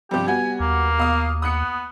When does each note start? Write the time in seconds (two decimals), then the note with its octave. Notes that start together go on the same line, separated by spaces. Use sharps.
0.11 G2 C3 F3 G4
0.27 G3 B3 F#4 G#5
0.60 D#2 A#3
0.98 B2 F5 D#6
1.42 B3 D#6 F#6 C#7